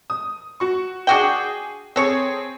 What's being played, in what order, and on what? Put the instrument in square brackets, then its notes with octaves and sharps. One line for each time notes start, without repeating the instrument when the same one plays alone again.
[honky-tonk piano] D#6
F#4 C#6
[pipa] D4 F#4 G5 [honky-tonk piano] G#4 F#7
[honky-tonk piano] C4 G#4 G#6 [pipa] A4 C#5